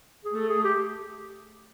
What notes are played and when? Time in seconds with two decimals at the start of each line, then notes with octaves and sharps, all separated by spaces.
0.25 G#4
0.35 A3 A4
0.49 G#4
0.64 G4